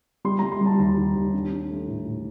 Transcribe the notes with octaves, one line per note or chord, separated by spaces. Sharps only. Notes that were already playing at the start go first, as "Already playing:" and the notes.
G3 C6
G3 A#5
C6
G3
A5
D#2 A#5
D#2
D#2
D4
D4
A3
A2
A2